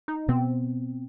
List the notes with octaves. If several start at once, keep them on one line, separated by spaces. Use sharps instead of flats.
D#4
B2 B3 C4